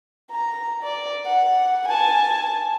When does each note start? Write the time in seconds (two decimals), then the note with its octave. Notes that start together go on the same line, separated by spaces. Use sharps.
0.31 A#5
0.83 D5
1.26 F#5
1.88 G#5 A5